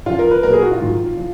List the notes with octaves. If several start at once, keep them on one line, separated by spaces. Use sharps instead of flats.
F#2 F3 F4
A#4
B4
A#2 F#3 A#4
G#4
F#4
F4
G#2 D#3 F#3
F3